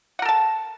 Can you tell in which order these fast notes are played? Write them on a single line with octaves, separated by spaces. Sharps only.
F#5 A#4 A4 A5